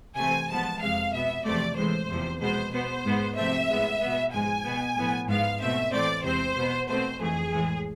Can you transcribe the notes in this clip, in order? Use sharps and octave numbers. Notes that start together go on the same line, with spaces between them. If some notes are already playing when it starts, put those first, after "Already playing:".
C3 E3 A3 C4 G#5
G#2 F3 B3 A5
F2 C3 G#3 F5
B2 B3 E5
E2 C3 F3 A3 C4 D5
A2 E3 G#3 C5
E2 C3 F3
B2 G#3 B3 C5
B2 B3 C5
G#2 G#3 B3
C3 F3 A3 C4 E5
A2 G#3 B3
B2 B3
G#2 F3 G#3 G#5
B2 B3
A2 F3 B3
G#2 G#3 B3 F5
B2 A3 C4 E5
A2 E3 A3 C4 D5
E2 C3 G#3 C4 C5
B2 B3
B2 A3 C4 C5
F2 E3 A3 G#4
A2 E3 G#3